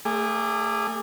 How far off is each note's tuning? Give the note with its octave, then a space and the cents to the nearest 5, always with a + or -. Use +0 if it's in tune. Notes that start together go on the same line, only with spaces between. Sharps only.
A3 +30 G#4 -20 D6 +0